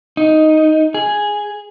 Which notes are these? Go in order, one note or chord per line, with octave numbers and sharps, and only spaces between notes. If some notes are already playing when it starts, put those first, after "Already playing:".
D#4
G#4